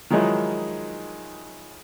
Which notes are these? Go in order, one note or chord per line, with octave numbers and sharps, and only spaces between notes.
D#3 F3 F#3 G#3 D#4 E4